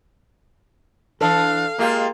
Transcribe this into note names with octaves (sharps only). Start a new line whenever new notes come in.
E3 D4 A4 F5
G#3 A#3 F4 G4